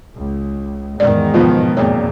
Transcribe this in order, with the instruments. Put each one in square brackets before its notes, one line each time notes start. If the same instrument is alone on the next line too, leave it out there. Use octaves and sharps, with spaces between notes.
[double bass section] C#2
[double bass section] E2 G#2 D#3 [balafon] D5
[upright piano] B2 F3 B3 [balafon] F4
[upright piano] E1 F2 A#2 [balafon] C#5